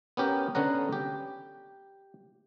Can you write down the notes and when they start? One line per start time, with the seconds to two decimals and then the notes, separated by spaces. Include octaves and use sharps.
0.17 B3 C#4 G4 A#4
0.55 D3 B3 C#4 F#5 A#5
0.93 G4